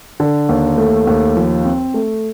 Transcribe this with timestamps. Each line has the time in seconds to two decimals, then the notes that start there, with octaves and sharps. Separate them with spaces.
0.20 D3
0.49 D#2
0.78 A3
1.07 D#2
1.37 F3
1.65 C4
1.94 A3